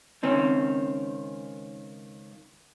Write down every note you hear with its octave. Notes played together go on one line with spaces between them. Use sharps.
C#2 D#3 C4 C#4